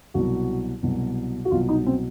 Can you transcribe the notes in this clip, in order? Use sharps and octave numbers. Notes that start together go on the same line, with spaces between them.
C2 B2 F#3 F#4
C2 B2 F#3
F#4
C2 B2 F#3 F4
D#4
C4